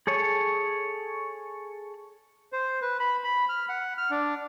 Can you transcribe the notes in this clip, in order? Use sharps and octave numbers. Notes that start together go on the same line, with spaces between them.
G#4 A4 C#5 G#5
C5
B4
B5
B5
F6
F#5
F6
D4